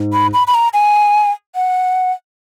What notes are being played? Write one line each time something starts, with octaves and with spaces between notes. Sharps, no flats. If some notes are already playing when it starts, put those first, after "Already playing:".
Already playing: G#2
B5
B5
B5
A#5
G#5
F#5